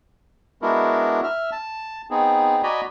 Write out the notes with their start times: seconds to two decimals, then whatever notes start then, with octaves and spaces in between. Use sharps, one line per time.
0.62 G#3 B3 D4 E4 F#4 A#4
1.24 E5 F6
1.52 A5
2.11 B3 C4 D#4 G#4
2.63 F#4 D5 D#5 G#5 A#5 B5